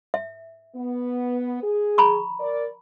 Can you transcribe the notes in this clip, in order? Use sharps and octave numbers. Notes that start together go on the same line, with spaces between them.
E5
B3
G#4
A#5 B5 C#6
A#4 D5